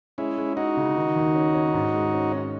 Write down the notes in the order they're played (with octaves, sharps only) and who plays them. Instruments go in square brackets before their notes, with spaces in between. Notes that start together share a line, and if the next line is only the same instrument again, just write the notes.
[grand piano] G#3 [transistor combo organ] C#4 E4
[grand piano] G#3
[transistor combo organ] D#4 F#4 [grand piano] E4
[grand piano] C#3
D#3
D#2
C#4
C#4
G#2
G#3
C#4
C#4